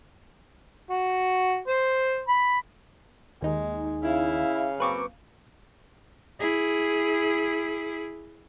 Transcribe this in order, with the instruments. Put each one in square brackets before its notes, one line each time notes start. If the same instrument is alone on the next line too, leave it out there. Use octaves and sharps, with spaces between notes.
[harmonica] F#4
C5
B5
[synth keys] D#2 D#4 [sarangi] G#3
[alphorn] C#3 [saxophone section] E4 [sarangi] F5
[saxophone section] F#2 A#3 C4 [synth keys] B4 C#6 D6
[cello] E4 G#4